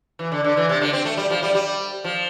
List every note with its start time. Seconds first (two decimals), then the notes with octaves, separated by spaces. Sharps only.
0.19 E3
0.32 D3
0.45 D3
0.57 E3
0.69 C3
0.81 D3
0.93 C4
1.05 A3
1.17 G3
1.30 F3
1.43 G3
1.55 G3
2.04 F3